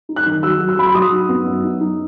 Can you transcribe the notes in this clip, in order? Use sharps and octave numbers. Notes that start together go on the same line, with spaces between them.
D#4
F#6
D#3
F#3 E6
F#3
E6
F#3 B5
C6
F#3 D#6
D#4
B3
F#2
D#4
D#4